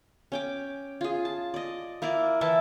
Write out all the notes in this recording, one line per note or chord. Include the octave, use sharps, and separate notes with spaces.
C#4 G5 D6
F4 G#4
A5
D5 D#5
A#3 E4 A#4 D5
E3 E4 A5